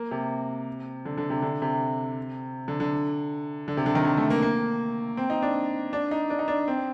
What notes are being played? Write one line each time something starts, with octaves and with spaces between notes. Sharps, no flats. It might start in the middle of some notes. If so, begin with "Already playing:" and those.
Already playing: A#3
C3
D3
D3
C3
D3
C3
D3
D3
D3
C3
D3
D#3
D3
A3
A#3
A#3
C4
D#4
D4
D4
D#4
D4
D#4
D4
C4